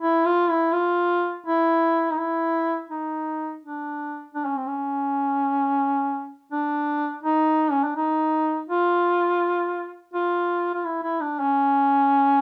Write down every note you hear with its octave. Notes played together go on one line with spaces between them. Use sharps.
E4
F4
E4
F4
E4
D#4
E4
D#4
D4
D4
C#4
C4
C#4
D4
D#4
C#4
D4
D#4
F4
F4
F4
E4
E4
D4
C#4